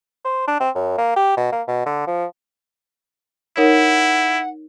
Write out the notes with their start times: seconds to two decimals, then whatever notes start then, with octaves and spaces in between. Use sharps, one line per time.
0.25 C5
0.48 D4
0.60 C4
0.75 F#2
0.98 A#3
1.16 G4
1.37 B2
1.52 A#3
1.67 B2
1.86 D3
2.07 F3
3.57 D#4 E4 A#4 C#5 F#5